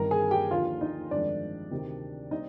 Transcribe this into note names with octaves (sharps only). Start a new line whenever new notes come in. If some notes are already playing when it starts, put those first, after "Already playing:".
Already playing: G1 G2 D#3 G3 C4 A#4 A#5
G#4 G#5
G4 G5
D#2 D3 F3 F4 F5
D#4 D#5
G1 F2 D#3 G#3 D4 D5
D2 C3 D#3
G3 C4 D#4 D#5